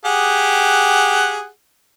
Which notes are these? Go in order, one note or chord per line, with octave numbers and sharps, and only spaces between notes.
G4 G#4 F#5